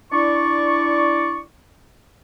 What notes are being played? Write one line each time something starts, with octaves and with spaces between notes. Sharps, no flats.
D4 E4 D5 C#6